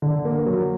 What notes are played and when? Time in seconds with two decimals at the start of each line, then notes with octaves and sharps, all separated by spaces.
0.02 D3
0.25 A#3
0.46 F#3